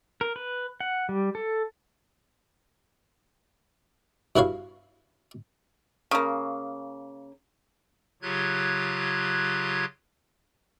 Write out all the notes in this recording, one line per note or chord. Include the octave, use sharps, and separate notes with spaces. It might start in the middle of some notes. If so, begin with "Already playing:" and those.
A#4
B4
F#5
G3
A4
G2 E4 F#4 C#5 F5
C#3 A#3
C#3 F#3 F4 G4 F#6 G#6